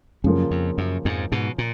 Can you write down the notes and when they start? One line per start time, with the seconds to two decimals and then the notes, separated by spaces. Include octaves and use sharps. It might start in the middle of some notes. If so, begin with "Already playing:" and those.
0.24 F#2 C#3 F3 A#3
0.51 F2
0.78 F#2
1.05 F2 G#2
1.32 G#2 B2
1.58 A#2